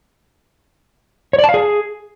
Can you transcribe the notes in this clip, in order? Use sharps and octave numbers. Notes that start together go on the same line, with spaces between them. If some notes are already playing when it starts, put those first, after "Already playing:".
C#5
D5
A5
F5
G#4